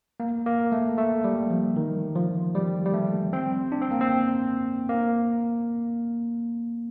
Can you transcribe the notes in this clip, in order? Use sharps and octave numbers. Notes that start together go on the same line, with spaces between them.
A#3
A#3
A3
A3
G3
F3
D#3
F3
G3
G3
A3
C4
D4
C4
A#3
C4
A#3